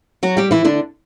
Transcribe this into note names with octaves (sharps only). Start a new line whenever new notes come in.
F#3 F#4
G3 G4
E3 E4
D3 D4